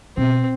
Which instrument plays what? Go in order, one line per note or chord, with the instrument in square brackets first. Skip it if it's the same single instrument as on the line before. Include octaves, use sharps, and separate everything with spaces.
[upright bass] B2 [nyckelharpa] C4